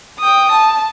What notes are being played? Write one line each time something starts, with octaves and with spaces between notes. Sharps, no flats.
G5 D#6
A5